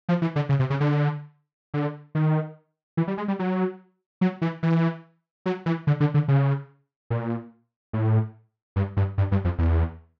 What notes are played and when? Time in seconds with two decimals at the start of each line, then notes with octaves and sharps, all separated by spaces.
0.09 F3
0.22 E3
0.36 D3
0.49 C#3
0.59 C3
0.70 C#3
0.80 D3
1.74 D3
2.15 D#3
2.97 E3
3.08 G3
3.18 G#3
3.28 G3
3.39 F#3
4.21 F#3
4.42 E3
4.63 E3
5.46 F#3
5.66 E3
5.87 D3
6.00 D3
6.14 D3
6.28 C#3
7.10 A#2
7.93 A2
8.76 G2
8.97 G2
9.18 G2
9.32 G2
9.45 F2
9.58 E2